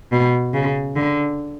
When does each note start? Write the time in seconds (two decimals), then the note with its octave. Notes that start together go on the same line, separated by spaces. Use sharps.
0.12 B2
0.54 C#3
0.96 D3